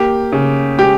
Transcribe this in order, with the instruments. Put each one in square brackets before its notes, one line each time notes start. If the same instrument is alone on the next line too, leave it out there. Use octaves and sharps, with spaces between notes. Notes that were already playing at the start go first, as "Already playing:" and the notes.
Already playing: [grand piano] A#3 [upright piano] G4
[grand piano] C#3
[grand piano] G#3 [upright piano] G4